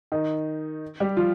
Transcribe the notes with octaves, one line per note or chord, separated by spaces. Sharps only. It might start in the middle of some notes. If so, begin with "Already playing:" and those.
D#3 D#4
G3 G4
F3 F4